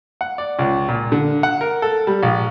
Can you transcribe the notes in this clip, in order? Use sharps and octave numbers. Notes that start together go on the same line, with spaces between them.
F#5
D5
C#2
A#2
D3
F#5
A#4
A4
G3
A#1